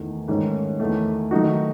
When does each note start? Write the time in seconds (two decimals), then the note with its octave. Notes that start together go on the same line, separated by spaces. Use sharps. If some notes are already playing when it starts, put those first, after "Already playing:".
Already playing: E2 D#3 A3
0.28 G#2 D#3 A3 C#4
0.80 E2 D#3 A3
1.31 D#3 F#3 A3 D#4 F#4